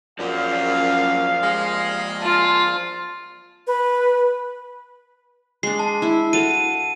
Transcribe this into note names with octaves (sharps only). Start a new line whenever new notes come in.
F#2 F3 D4 F5
G3 G#3
F4 A5
B4
G#3 D4 C7
A5
E4
F#4 A4 F5 D#7